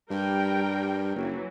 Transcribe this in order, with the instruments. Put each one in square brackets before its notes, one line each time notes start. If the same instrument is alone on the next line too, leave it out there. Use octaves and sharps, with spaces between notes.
[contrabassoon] G2 [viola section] G3 A#4 G5
[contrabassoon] F#1 [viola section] E3 F#3